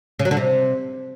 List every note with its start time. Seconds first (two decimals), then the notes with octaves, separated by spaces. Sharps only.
0.19 C#3
0.25 F#3
0.31 D3
0.37 C3